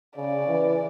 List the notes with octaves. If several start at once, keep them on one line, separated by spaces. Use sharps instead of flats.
C#3 D5
E3